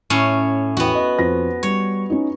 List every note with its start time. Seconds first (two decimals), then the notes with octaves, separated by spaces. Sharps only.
0.10 A2 C#4 C#5
0.77 E2 B3 F#4 G5
0.95 D#5
1.19 F2 C5 A#6
1.63 G3 C#5
2.10 C#4 D#4